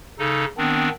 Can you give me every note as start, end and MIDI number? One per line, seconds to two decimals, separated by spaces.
0.19 0.45 49
0.19 0.45 63
0.19 0.45 69
0.58 0.89 51
0.58 0.89 59
0.58 0.89 60
0.58 0.89 62